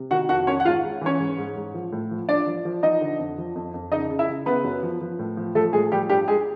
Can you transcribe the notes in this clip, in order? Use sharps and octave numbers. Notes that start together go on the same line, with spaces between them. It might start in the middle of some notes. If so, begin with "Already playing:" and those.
Already playing: C3
D#3 F#4 F#5
F2 F#4 F#5
D#3 C#4 C#5
F#5
G#2 F4 F5
G#2
E3 C#4 C#5
G#2
G#2
G#2
F3
A2
F3
F3 D4 D5
F3
F3
F3 D#4 D#5
D3
F2
F3
F2
F2
C#3 D#4 D#5
C#3
E4 E5
C#3
C#3 B3 B4
F#2
F3
F3
A2
F3
F3 A3 A4
A2 G#3 G#4
F3 G3 G4
G2 G3 G4
G2 G#3 G#4